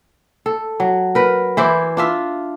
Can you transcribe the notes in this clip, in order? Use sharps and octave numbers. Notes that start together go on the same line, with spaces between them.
A4
F#3
A#4 B4
E3 E4 C5 D5
D4 F4 E5